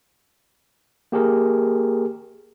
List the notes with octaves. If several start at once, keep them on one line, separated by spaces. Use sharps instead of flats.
A#3 G4 G#4 A#4